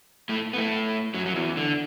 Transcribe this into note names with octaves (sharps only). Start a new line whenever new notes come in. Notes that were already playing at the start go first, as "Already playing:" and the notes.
A2 A3
B3
A2 A3
F#2 F#3
F#3
E2 E3
D3